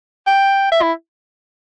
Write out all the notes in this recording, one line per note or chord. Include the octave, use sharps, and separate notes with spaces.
G5
E5
E4